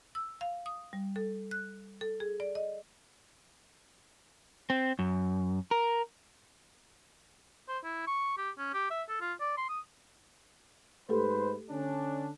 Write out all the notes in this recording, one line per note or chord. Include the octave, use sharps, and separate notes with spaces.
E6
F5
D#6
G3
A4
F#6
A4
G#4
D5
D#5
C4
F#2
A#4
C5
E4
C#6
G4
C#4
G4
E5
A4
F4
D5
C6
D#6
G#2 A3 G4 A4 B4 C5
D3 C#4 D4